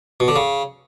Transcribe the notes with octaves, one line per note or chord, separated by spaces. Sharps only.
B2
D3
C#3